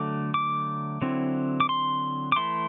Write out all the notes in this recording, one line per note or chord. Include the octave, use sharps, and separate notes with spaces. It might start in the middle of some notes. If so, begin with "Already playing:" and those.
Already playing: D3 F#3 A3 D6
D6
D3 F#3 C4 E4
D6
C6
D6
E3 A3 E4 C6